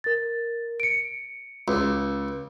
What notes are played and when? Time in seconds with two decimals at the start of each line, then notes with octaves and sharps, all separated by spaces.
0.04 A#4 A6
0.80 C#7 D7
1.68 C#2